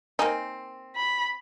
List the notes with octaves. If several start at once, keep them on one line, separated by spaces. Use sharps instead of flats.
A#3 C4 D#4 G#5 A#5
B5